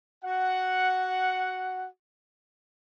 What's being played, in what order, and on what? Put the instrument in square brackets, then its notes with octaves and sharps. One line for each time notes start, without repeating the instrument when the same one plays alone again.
[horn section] F#4 F#5